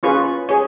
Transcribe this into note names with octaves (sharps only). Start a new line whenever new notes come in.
C#4 F4 G#4 B4 C#6
G#4 C#5